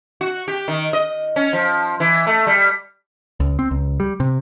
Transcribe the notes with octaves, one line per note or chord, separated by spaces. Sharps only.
F#4
G4
D#3
D#5
C#4
F3
E3
A3
G3
C#2
C4
C#2
G3
C3